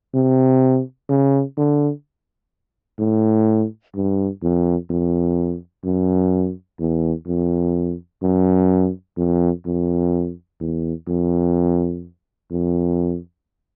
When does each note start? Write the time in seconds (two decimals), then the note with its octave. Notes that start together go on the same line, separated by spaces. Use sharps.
0.14 C3
1.09 C#3
1.57 D3
2.99 A2
3.95 G2
4.43 F2
4.90 F2
5.85 F#2
6.80 E2
7.27 F2
8.23 F#2
9.17 F2
9.66 F2
10.60 E2
11.08 F2
12.51 F2